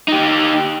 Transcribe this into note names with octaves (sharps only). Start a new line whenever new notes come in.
D#4 G4